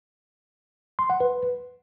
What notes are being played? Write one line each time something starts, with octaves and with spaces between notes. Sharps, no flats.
C6
F#5
B4